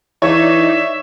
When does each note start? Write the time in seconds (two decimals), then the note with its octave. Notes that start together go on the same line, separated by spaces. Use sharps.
0.22 E3 D#4 C#5 D5 E5